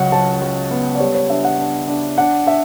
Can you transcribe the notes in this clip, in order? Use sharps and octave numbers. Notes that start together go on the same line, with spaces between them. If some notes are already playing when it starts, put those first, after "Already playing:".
Already playing: C#2 F#3 F#5
F#3 A5
F#3
B3
D5
G3 C#5
C#5
D4 E5
F#5
D4
D4
D4 F#5
D4 E5